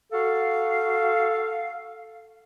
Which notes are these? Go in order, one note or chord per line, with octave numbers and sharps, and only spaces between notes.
F#4 A4 F5